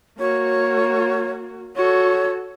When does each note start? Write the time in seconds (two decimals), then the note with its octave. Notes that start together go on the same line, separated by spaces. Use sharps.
0.19 A#3 F#4 C#5
1.76 F#4 A4 C#5